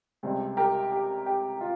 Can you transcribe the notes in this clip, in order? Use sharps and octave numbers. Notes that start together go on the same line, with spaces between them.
C#2 C3 G3 C4
G4 A#4
G4
G4
F4